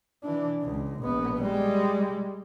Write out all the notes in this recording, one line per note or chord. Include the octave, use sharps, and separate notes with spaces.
E3 D4
C#2
A#1 B3
G3 G#3